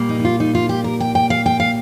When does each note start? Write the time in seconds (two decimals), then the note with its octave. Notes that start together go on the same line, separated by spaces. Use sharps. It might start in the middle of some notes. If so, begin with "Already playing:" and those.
Already playing: A#2 G3 A#3
0.09 D#4
0.20 D#4
0.25 F4
0.40 D#4
0.55 F4
0.69 G4
0.84 A#4
1.00 G5
1.15 G5
1.30 F5
1.46 G5
1.60 F5